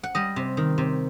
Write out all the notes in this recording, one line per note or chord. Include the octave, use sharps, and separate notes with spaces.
F#5
G3 D#5
C3
D#3
C3